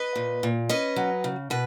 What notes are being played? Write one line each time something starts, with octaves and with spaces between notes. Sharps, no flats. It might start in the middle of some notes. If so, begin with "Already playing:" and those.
Already playing: B4 D#5
A#2
A#2
C#4 B4 D#5
F#3
C#3
B2 B4